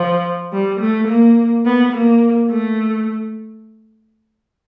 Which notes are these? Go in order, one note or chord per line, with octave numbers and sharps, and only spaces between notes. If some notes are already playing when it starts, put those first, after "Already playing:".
Already playing: F3
G3
A3
A#3
B3
A#3
A3